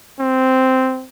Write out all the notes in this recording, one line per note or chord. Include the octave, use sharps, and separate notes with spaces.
C4